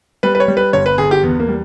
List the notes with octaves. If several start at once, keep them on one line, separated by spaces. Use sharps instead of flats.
G3 B4
B4
C#5
G3
B4
G1 C#5
B4
G1 G#4
G4
E2 B3
A#3
G3